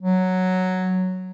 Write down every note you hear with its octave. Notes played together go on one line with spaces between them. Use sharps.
F#3